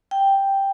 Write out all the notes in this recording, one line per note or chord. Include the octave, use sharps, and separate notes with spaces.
G5